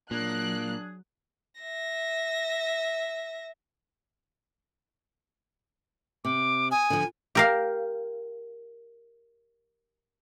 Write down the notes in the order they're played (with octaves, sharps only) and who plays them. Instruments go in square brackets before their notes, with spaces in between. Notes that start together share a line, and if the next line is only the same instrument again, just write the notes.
[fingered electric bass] A#2 [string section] F#3 F#6 [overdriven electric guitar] A#3 [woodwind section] D4 G#4
[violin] E5 A#6
[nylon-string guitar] C3 [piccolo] D6
[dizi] G#5 [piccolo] D#6
[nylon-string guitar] D3 F3
[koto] G4 A#4 F5